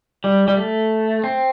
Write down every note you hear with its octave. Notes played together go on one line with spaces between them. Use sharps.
G3
G3
A3
C4